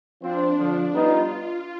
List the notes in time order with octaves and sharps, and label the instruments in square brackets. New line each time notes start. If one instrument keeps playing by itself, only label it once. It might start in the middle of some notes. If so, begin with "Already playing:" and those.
[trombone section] F3 C4 F4 C5 [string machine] D4
[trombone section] F2 D3 F3
[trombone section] G3 B3 D#4 B4 [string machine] F4